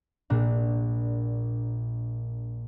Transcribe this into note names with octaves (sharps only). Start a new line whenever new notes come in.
A#1 A#2 D4